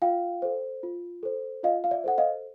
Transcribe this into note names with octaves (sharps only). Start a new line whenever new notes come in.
F4 F5 G5
A4 C5
F4
A4 C5
F4 D#5 F5
F5
D5 E5
A4 C5 F#5
D#5 F5